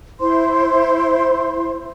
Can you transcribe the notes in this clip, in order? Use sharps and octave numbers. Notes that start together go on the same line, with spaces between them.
E4 C5 C6